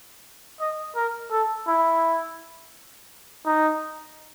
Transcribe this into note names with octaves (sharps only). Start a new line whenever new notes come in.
D#5
A#4
A4
E4
D#4